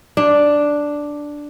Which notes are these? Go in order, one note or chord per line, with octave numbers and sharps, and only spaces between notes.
D4